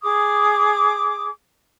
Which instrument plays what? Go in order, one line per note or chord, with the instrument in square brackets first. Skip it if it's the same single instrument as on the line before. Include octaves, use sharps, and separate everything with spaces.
[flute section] G#4 D6 D#6